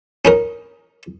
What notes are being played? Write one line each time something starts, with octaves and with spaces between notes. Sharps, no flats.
C#4 D#4 A#4